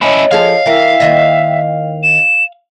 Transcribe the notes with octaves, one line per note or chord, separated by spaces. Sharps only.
C#4 E4 C#5 D#5
F3 G#4 A4 F5
E3 A#4 E5 G5
D#2 D#3 D#5
E7